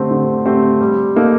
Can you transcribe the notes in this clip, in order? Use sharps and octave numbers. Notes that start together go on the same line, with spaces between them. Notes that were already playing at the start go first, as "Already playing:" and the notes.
Already playing: D3 A3 C4 G4 C5
D3
A3 C4 G4 C5
G3
A#3 D#4 A4